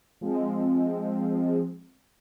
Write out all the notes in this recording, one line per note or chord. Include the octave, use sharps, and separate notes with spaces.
F3 G#3 C4